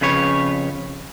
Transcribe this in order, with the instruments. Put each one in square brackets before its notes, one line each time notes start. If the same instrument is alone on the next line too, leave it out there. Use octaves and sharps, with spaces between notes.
[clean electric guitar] F2 C#3 B4 C#5